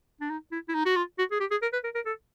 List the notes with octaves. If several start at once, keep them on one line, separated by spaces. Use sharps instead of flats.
D4
D#4
E4
E4
D#4
F#4
F4
F#4
G#4
G4
G#4
A#4
B4
A#4
A#4
A4